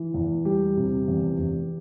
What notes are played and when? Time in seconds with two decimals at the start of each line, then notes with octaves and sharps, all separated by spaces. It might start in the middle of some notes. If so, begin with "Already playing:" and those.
Already playing: E3
0.14 E2
0.45 G3 G4
0.77 C3
1.08 E2
1.39 E2